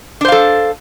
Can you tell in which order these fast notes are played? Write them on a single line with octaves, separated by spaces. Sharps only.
D4 C5 F5 A4